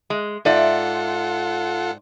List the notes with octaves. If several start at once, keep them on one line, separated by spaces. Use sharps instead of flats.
G#3
G#2 F4 A4 D5 E5 F#5